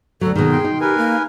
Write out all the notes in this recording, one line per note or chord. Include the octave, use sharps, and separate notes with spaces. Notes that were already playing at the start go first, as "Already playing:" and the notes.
D2 F#3 A4
B2 D#3 G#4
G5 C6
D#4
G4 A#4 B4 G#5
A#3